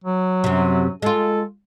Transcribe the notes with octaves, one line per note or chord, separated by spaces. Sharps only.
F#3
F#2 C3
G#3 F4 A4